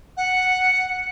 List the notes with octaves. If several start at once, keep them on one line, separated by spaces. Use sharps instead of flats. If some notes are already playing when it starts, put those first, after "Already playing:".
F#5